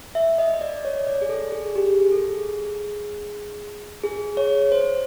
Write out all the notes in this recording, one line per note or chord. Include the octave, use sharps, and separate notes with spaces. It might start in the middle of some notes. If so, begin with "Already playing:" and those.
E5
D#5
D#5
D5
C#5
D5
G#4
A4
G#4
G4
G#4
A4
G#4
G#4
C#5
C5